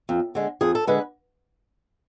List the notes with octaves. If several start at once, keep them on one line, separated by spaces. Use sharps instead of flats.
F2
D3 G#3
F2 G#4
A4
D3 G#3 B4